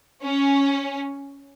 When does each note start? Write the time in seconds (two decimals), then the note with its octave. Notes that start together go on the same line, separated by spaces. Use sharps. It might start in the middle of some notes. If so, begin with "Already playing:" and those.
0.24 C#4